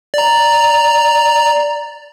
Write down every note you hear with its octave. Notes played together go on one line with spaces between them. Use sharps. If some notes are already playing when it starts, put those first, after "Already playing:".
D5 A#5